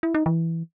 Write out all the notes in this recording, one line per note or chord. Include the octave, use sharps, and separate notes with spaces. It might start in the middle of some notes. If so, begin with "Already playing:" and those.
E4
D#4
E3